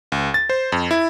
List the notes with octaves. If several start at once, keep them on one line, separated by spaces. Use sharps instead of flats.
C#2
A6
C5
F2
E4